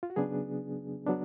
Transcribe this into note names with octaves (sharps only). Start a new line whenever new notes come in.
F4
F#4
C#3 F#3 B3 D4 G#4
F#3 B3 D4